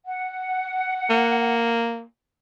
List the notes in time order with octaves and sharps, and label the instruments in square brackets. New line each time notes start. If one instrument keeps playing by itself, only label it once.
[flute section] F#5
[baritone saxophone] A#3